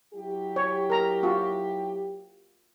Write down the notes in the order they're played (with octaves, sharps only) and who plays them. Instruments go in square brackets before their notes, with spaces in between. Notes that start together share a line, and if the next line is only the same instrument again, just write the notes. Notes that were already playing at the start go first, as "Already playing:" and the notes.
[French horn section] F#3 E4 G4
[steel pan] C#5
A#4 A#5
F4 F#4